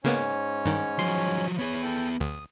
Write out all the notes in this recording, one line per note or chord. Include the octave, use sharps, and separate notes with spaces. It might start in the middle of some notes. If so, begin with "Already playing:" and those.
G#2 C#3 A#3 B3 C#4 C#5
G2 D#3
F3 F#3 C6
B3 G#4 C#5
A4 G5
D2 D#6